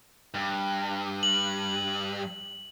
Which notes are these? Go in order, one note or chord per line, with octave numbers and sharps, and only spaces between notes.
G2
F#7